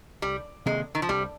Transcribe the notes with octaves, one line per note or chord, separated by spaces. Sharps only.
C2 G3
C3 D#3 G#3 A#3
D#3
F3
C2 G3